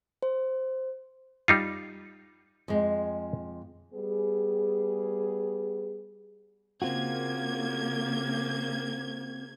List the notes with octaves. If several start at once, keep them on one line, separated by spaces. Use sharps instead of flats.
C5
G3 D#4 F4
F2 G#3
G3 B3 G#4
C#3 A#3 C4 F4 F#4 G#6